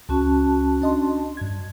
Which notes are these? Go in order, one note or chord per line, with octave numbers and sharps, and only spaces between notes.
C#2 C#4 F#4 A5
D4 D#5 C6
G2 G#6